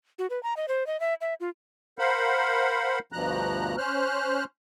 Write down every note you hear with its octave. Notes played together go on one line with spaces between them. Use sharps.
F#4
B4
A#5
D#5
C5
D#5
E5
E5
F4
A#4 C5 F5 F#5 B5
D2 G2 B2 F3 A#5 F#6
C#4 C5 F6 F#6